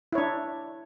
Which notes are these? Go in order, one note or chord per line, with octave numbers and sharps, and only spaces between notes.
D4 E4 C#5